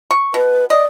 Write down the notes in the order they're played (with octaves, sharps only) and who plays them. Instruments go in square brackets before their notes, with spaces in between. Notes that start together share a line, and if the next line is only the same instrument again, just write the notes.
[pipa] C#6
[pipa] B2 [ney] B4
[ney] D5 [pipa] D#5